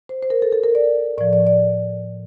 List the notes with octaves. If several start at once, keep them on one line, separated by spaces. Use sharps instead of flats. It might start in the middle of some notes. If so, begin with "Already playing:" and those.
C5
C5
A#4
A4
A4
A#4
D5
A2 F3 D5
D5
D5